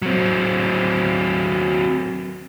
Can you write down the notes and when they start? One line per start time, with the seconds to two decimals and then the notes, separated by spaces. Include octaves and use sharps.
0.02 F#3 C4